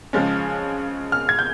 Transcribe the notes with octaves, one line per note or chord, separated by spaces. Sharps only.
C#3 F3 G#3 C#4
F6
G#6
G6